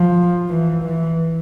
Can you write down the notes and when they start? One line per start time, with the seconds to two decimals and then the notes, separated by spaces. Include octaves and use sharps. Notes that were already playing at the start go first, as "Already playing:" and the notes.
Already playing: F3
0.49 E3
0.83 E3